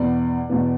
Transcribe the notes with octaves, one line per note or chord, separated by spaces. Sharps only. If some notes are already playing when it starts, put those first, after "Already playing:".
Already playing: E2 B2 B3 D5
E2 B2 B3